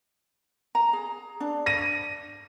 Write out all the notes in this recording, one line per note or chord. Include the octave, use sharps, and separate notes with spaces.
A#5
G#4
D4
A#6 D#7